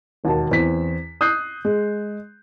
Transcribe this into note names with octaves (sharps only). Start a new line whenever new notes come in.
E1 D#2 D#3 F#4 A5
E2 C4 B6
D#6 F#6 G6 C7
G#3